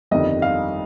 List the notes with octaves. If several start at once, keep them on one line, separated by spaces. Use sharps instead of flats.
G1 F2 D#3 G3 D#5
F5